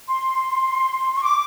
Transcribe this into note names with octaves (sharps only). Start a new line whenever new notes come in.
C6
C#6
D6